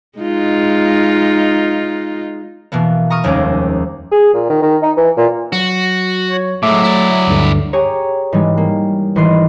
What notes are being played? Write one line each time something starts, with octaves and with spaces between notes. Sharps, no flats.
G#3 D#4 F4
B2 E3 A#3 B3
A#5 C#6 D#6 F6
F1 D#2 G3 G#3 C#4 D6
G#4
A#2
D#3
D#3
D#4
E3
A#2
F#3 F#4
C#5
A2 F#3 G#3 A3 E5 D6
E4 D5
D2 G2 D3
G4 G#4 C#5 A#5
G#2 E3 G3 G#3
A#3
G#1 E3 D#5 C6 C7